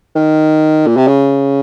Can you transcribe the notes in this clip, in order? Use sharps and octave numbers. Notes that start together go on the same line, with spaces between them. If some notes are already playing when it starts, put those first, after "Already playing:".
D#3
A#2
C3
C#3